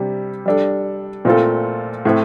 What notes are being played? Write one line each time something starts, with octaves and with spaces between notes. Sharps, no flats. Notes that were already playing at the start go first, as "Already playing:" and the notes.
Already playing: C3 G3 D4
G3 D4 A4
A#2 A3 C4 F4 A4
A2 A3 C4